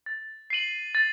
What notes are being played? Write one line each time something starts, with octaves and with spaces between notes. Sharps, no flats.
A6
C7 D#7 F#7
A6